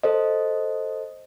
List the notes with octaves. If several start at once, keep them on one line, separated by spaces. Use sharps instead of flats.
A4 C5 D#5